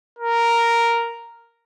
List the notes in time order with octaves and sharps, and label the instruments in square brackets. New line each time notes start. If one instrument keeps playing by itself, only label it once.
[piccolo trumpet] A#4